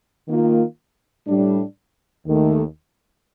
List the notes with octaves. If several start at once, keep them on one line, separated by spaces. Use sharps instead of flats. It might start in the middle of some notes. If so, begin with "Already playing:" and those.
D#3 A#3 F4
A2 G3 D4
D#2 D#3 A3